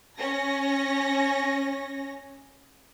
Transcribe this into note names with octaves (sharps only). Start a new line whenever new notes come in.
C#4 A#6